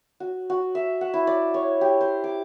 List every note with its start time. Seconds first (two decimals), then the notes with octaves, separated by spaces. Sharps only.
0.20 F#4
0.50 F#4
0.75 E5
1.01 F#5
1.14 E4
1.27 D5
1.54 C#5
1.81 G4
2.01 C5
2.24 D6